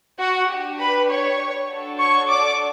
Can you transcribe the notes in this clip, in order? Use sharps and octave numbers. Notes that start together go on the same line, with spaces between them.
F#4 F#5
D4 G4
B4 B5
C#5 C#6
D4 F#4 A4
C#5 C#6
D5 D6